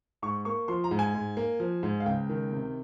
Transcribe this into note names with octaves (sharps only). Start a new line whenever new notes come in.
G#2 C#6
A#3 C#6
F3 C6
A#5
G#2
G#5
G#2
A#3
F3
G#2
F5
C#2 G5
D#3
C3